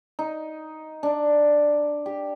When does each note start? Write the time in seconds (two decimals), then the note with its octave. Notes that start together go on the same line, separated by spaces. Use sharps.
0.19 D#4
1.03 D4
2.06 G4